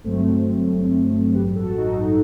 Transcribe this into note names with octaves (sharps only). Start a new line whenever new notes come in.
G1 G2 F#3 A3 C4
G1 G2 F#3
A1 G2 F#3 G4 B4
F#4 A4
D#4 F#4
F#3